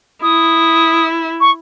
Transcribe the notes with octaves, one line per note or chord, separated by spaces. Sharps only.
E4 D#6
C#6